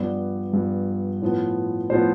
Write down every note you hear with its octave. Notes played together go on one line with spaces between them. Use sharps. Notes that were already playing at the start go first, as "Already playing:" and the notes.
Already playing: G2 F3 B3 D5
G2 F3 B3
A2 F3 B3
A2 F3 B3 C5